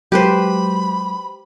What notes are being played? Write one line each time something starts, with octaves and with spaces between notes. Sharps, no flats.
F#3 G#3 G4 B4 C5 B5